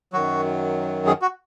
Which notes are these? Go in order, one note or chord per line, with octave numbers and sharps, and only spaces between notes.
F#2 D#3 F#3 F#4
G#4
F#4